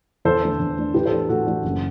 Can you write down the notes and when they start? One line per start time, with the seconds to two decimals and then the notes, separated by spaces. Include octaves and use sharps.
0.25 E2 A4 C5
0.43 D3 A3 D4
0.59 E2
0.77 D3 A3 D4
0.94 A2 G4 B4
1.06 A4 C5
1.12 E3 A3 D4
1.29 A2 F#4 A4
1.46 E3 A3 D4
1.64 F#1